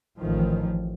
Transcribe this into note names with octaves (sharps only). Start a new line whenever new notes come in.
A1 D#3 F3